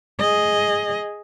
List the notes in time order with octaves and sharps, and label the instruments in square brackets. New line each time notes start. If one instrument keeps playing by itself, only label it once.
[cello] G#4 D#5